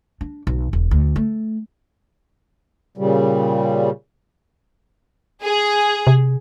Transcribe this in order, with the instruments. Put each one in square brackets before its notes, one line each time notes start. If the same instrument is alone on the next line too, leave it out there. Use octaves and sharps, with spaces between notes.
[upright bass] D4
B1
E1
D2
A3
[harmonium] A#2 C#3 G3
[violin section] G#4
[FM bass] C3